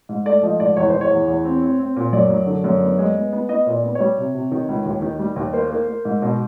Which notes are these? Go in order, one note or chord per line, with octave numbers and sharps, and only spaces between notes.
G#2
A3 D5
F3 D#5
G#2 D5
E2 C#5
E2 C5
C#5
E2
E2
C4
C4
C4
A#2
F#2 D5
F#3
D3
F#2
B3
G#3
B3
B3
B3 D#5
A#2
D5
B3
C#5
G3
C3
C3
D#3
C#2
D#2
D#3
G3
D#2
A#3 C5
A#3
A#3
G#2
B2